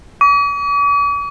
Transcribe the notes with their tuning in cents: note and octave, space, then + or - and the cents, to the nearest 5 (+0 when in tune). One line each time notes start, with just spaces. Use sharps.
D6 -45